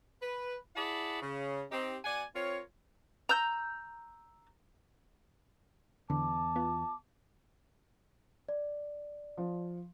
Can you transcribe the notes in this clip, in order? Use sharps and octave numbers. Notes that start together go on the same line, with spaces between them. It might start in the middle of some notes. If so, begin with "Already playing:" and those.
B4
E4 G#4 D5 F#5 A5 B5
C#3
C4 D#4 G4
B2 D5 F#5 G#5
C4 F4 A#4 C#5
A#5 E6 G6
E2 D3 A5 D6
B3 F4
D5
F3